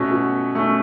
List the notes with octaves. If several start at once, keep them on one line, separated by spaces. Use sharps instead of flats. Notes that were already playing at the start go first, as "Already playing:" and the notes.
Already playing: B2 A3 C#4
B2
A3 C#4